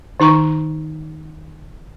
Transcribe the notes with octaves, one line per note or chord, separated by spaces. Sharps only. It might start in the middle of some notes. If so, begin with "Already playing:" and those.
D#3 D#4 A#5 C#6